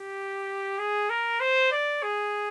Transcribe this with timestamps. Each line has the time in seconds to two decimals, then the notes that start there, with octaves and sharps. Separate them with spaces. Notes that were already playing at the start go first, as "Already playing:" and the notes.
Already playing: G4
0.79 G#4
1.10 A#4
1.40 C5
1.72 D5
2.03 G#4